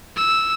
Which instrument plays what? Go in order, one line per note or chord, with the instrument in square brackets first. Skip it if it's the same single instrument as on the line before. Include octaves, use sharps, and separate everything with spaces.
[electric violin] E6